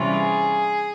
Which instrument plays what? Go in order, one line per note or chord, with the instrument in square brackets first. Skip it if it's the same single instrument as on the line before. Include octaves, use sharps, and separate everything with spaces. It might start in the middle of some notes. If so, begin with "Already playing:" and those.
Already playing: [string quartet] C3 E3 G3 C#4 F4
G#4